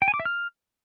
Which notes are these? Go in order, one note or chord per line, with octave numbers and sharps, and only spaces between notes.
G5
G#5
D6
E5
F6